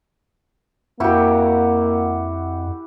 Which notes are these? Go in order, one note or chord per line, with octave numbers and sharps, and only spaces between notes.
F2 A#3 E4 F#4 G4